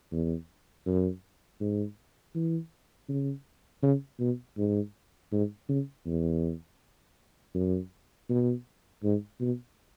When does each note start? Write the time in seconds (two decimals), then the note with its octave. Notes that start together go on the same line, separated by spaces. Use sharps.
0.12 E2
0.86 F#2
1.60 G#2
2.35 E3
3.09 C#3
3.83 C#3
4.20 B2
4.58 G#2
5.32 G#2
5.69 C#3
6.06 E2
7.55 F#2
8.30 B2
9.04 G#2
9.41 B2